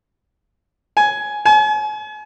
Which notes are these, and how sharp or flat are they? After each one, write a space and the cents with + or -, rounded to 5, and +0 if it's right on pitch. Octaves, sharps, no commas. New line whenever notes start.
G#5 +10
G#5 +40